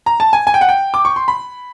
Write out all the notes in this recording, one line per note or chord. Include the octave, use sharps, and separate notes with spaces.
A#5
A5
G#5
G#5
G5
F#5
G5
D6
C#6
C6
B5